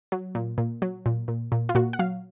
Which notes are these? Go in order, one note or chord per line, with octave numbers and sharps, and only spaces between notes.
F#3
A#2
A#2
F#3
A#2
A#2
A#2
F4
A#2 F#4
F#5
F#3 F5